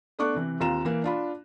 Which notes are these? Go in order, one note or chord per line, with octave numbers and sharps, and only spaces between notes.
A3 B3 D4 C#6 D6 F#6
C3 E3
D#2 C4 F4 A#5 E7
E3 A#3
D4 F4 B5